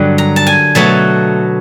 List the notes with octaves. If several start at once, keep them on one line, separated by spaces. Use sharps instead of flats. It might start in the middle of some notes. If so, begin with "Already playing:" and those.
Already playing: G2 D3 F#3
A#5
A5
G#5
B2 F#3 A3 A5